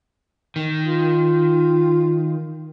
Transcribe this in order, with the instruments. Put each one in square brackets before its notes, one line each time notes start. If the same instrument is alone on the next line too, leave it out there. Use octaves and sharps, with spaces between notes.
[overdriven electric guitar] D#3
[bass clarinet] F4